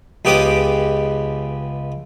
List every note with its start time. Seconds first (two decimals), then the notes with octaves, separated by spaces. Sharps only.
0.25 C#2 B3 G4 D6 D#6